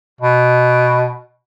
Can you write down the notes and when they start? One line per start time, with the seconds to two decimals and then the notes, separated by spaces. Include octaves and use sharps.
0.21 B2